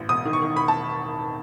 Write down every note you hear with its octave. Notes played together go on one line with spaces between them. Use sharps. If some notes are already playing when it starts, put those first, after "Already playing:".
Already playing: A1
E1 D#6
D#3
C#6
D#3
E1 B5
A5